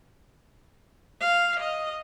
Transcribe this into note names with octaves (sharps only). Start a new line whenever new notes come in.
F5
D#5